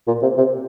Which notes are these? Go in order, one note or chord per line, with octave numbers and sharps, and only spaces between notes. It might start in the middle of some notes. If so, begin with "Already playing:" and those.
A#2
C3
C3